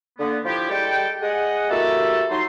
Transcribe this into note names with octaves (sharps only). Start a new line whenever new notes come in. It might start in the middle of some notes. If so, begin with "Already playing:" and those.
D3 A#3 B3
F3 E4 G4
G3 G#3 G4 A4 G5
G#4 D#5 F#5
A#3 E4 F#4 G4 A4
F#3 D#4 C6